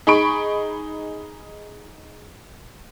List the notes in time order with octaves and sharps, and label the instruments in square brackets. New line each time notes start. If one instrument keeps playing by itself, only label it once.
[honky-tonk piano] D#4 G#4 B5 C#6 D7